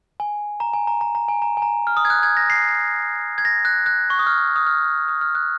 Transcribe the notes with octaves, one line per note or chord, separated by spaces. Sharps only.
G#5
A#5
G#5
A#5
A#5
A#5
G#5
A#5
G#5
A#5
F6
D#6
G#6
F#6
G#6
A#6
C7
G#6
A#6
F#6
F#6
C#6
D#6
F6
D#6
F6
D#6
F6
F#6